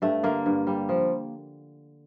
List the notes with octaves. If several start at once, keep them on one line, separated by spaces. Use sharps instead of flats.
G2 A3
D3 A#3
G2
G3
F3